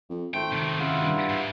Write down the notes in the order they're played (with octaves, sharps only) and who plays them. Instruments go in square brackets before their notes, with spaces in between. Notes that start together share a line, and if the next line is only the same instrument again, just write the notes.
[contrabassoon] F2
[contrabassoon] G#1 [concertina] A3 C5 [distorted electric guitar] G5
[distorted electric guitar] C3 D#3
[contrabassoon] C#3 [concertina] E4 F4 F#5
[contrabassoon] G2
[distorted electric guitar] G#2